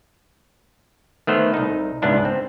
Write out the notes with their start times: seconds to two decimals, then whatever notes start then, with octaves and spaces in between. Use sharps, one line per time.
1.27 D#3 A3 B3 C5
1.54 C2 D#4
2.02 C#2 G#2 B3 D4 E4
2.25 C4